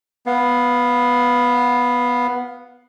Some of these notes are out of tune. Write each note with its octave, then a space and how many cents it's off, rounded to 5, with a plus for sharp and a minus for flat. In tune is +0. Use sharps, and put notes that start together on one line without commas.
B3 +0 F5 +15